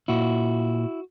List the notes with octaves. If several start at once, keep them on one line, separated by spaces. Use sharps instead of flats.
A#2 E4 F#4